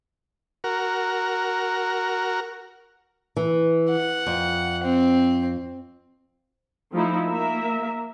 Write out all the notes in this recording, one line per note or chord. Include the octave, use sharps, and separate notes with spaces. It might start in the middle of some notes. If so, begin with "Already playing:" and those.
F#4 A#4
E3
F#5
F2
C4
F3 A3 D#4 E4
A#3 A#4 E5